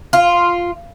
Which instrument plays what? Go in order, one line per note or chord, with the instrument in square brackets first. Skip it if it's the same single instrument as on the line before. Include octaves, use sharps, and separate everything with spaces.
[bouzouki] F4